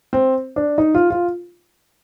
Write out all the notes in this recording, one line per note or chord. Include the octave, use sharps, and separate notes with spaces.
C4
D4
D#4
F4
F4